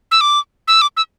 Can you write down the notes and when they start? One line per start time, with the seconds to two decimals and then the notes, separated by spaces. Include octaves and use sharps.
0.11 E6
0.21 D6
0.68 E6
0.82 D6
0.97 E6